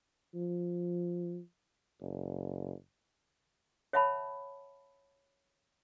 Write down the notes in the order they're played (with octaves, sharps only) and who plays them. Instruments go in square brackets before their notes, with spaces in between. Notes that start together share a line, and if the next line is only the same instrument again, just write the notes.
[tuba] F3
F#1
[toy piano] C#5 E5 F#5 A5 B5